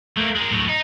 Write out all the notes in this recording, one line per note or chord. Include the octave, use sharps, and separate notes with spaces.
A3 A#3
G#3 A#4
A2 F#3
D#4